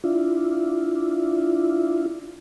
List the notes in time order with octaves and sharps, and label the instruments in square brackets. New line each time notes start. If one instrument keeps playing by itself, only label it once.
[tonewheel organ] D4 E4 F4